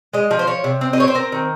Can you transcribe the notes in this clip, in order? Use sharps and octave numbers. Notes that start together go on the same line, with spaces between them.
G#3 D#5
F3
C5
F3 C#5
C3
C4
D#5
C4 C#5
C5
C4 A#4
D#3